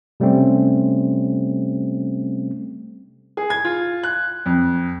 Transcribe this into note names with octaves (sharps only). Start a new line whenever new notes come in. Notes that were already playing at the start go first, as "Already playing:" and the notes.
C3 G3 A3 C4 C#4
G#4
G#6
F4
F#6
F2